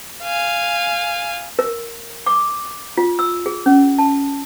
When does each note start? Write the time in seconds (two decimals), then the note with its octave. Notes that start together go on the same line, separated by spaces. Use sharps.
0.23 F5 G#5
1.59 A#4
2.26 D6
2.98 F4
3.19 E6
3.46 G#4
3.66 C#4
3.99 A5